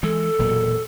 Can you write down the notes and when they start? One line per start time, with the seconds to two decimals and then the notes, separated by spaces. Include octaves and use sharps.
0.03 E3 G#3 A4
0.39 E1 A#2 F#3